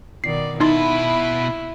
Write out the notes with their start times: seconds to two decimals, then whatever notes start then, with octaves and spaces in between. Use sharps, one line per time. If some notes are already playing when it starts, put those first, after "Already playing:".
0.24 B2 D#3 D5 C7
0.60 B2 D#4 E4 B4 C6 A6